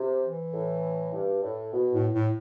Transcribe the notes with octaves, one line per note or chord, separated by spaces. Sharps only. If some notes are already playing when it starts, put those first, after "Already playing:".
Already playing: C3
E3
A2
G2
A2
B2
A2
A2